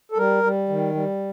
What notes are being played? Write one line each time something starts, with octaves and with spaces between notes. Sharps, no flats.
A4
G3 A#4
G3
D#3
G3